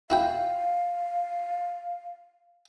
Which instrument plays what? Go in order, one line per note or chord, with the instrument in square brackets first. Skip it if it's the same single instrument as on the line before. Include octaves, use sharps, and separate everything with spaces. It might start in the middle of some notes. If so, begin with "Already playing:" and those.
[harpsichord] E4 F#4 G5 [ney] F5